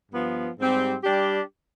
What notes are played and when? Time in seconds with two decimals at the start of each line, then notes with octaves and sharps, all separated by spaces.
0.11 G2 F3 B3
0.58 G#2 G3 C4 G4
1.04 G3 D4 G4